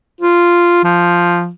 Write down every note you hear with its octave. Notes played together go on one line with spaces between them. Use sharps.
F4
F3